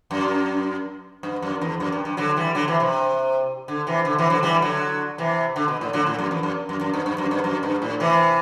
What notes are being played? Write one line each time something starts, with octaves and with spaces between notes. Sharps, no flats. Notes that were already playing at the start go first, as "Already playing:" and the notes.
F#2
G2
F#2
E2
F#2
G2
G2
D3 F#3
E3 G3
D3 F#3
C3 E3
C3
D3
C3 E3
D3
C3 E3
D3 F#3
E3 G3
D3 F#3
C3 E3
D3
B2
A2
D3 F#3
A2
F#2
E2
F#2
F#2
F#2
G2
G2
F#2
G2
F#2
G2
A2
C3 E3